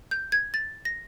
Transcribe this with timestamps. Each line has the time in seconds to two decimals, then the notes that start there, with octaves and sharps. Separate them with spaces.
0.11 G6
0.32 G#6
0.54 A6
0.85 A#6